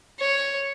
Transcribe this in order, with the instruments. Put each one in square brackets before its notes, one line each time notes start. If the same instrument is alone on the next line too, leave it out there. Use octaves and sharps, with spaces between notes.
[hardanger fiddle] C#5